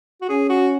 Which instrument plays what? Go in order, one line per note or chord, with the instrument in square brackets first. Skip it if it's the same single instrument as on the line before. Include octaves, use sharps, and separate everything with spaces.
[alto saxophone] F#4
[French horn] C#4 [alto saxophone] G#4
[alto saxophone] F#4